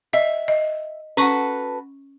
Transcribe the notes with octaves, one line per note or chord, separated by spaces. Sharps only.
D#5 E5
D#5
C#4 F#4 A4 B4 C#6